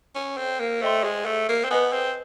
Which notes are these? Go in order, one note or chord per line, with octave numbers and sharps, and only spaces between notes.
C#4
C4
A#3
A3 C5 D#5 G5 C6
G#3
A3
A#3
C4
B3 B4 D#5 G#5
C4